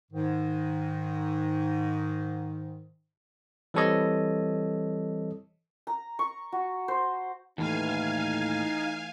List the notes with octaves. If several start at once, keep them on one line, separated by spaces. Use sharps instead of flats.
G#2 D#3
E3 G3 C4 A4 C#5 D#5
A#5
C#6
F#4
C5
D#2 A2 E3 A3 D#4 F5 G#5